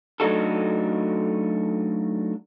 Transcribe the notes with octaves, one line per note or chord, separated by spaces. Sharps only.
F#3 A3 D4 D#4 F#4 A4